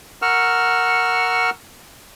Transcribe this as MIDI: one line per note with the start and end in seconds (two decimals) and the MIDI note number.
0.22 1.50 70
0.22 1.50 78
0.22 1.50 85
0.22 1.50 88
0.22 1.50 89